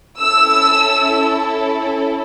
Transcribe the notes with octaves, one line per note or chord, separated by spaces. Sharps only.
C#4 E4 A4 E6